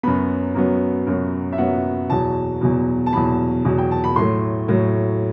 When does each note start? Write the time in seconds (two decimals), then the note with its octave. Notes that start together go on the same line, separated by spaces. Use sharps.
0.03 F#2 F#3 B3 B5
0.55 F#2 F#3 B3
1.07 F#2 F#3 B3
1.53 E5
1.58 F#2 F#3 B3 F#5
2.09 E2 B2 F#3 A5
2.61 E2 B2 F#3
3.06 A5
3.13 E2 B2 F#3 B5
3.65 E2 B2 F#3
3.78 G5
3.91 A5
4.04 B5
4.16 A2 F#3 A3 C6
4.68 A2 F#3 A3